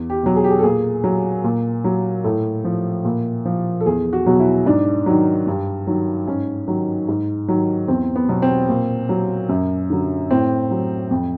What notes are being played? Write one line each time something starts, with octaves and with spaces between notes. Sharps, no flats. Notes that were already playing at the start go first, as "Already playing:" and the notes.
Already playing: E2
G4
B2 F#3
G#4
G4
G#4
A4
A#2 G#4
F#3
A#2
F#3
A2 A4
F3
A#2
F3
A4
E2 G#4
F#4
B2 F#3
E4
G#2 D4
D#3 F#3
G2
D#3 F#3
G#2 C#4
D#3 F#3
G#2
D#3 F#3
E2 C4
B3
B2 F#3
C4
A#2
F#3
F#2
D3 F#3
A2 C4
F#3
F2